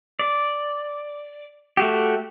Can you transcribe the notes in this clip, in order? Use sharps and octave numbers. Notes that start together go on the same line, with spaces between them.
D5
A3 F#4 G4